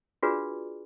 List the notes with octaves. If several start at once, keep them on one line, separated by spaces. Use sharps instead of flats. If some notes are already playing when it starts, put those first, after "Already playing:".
D4 F4 F#4 G#4 B4 D5